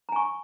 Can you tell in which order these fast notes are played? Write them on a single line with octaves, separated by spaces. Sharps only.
A#5 G#5 C#6